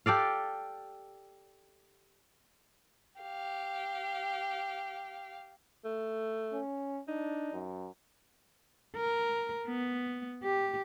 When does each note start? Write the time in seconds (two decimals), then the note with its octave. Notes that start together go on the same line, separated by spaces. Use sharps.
0.06 G4 A4 D5 F5
3.22 G4 F5
5.85 A3
6.53 C#4
7.08 D4 D#4
7.53 F#2
8.96 A#4
9.67 B3
10.43 G4